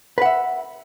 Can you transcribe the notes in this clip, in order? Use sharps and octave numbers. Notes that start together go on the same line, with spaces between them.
B4 E5 F#5